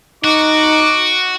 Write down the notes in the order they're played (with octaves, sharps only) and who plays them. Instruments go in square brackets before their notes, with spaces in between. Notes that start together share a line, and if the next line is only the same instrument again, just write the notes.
[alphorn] D#4 [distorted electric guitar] F#4 [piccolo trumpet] D6